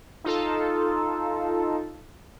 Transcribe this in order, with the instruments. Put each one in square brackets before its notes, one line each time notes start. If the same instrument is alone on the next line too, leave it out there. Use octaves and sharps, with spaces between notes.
[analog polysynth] D#4 F4 A4